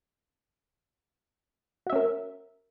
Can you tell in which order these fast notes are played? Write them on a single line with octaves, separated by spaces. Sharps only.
F#4 E5 C#4 A#4